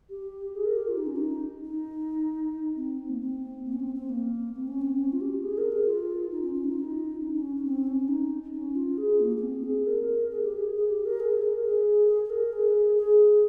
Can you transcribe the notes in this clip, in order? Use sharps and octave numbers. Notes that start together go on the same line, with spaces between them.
G4
G#4
A#4
G4
F4
D#4
C#4
D#4
D#4
C4
A#3
C4
A#3
C#4
C4
C4
A#3
C4
C#4
C4
C#4
F4
G4
G#4
A#4
G#4
F4
D#4
C#4
C#4
D#4
F4
D#4
C#4
D#4
C#4
C#4
C4
C#4
D#4
C#4
F4
G#4
A#3
A#3
C4
G#4
A#4
G#4
G4
G#4
G#4
G4
A#4
G#4
A#4
G#4
G#4
G#4
A#4
G#4
G#4